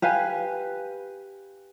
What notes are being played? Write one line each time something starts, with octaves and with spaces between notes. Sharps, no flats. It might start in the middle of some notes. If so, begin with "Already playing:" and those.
G4 B4 F5 G#5